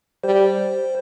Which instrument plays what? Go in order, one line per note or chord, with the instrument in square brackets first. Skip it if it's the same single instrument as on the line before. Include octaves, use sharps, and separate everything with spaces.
[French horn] G3 [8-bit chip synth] C5